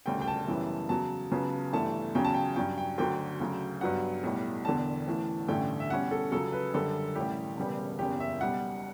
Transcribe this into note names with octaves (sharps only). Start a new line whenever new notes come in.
E1 D2 C#3 G3 G5
G5
A5
F#2 C#3 E3 G3 B3
E2 C#3 F#3 A5
C#2 C#3 F#3 B3
G1 G2 E3 A3 A5
E2 C#3 F#3 C#4 G5
A5
G5
G2 F#3 C#4 G5
G5
D2 D3 F#3 G5
D2 C#3 F#3
G2 F#3 B3 F#5
B1 A2 G3
E1 E2 D3 A5
A1 A2 E3
A1 G2 D3 A3 C#4 G5
E5
E2 B2 G3 C#4 F#5
A4
C#2 C#3 F#3 A4
B4
F#2 D3 G3 A4
A1 A2 G3 G4
E1 E2 C#3 G3 B3
F#1 E2 C#3 G4
E5
B1 B2 G3 F#5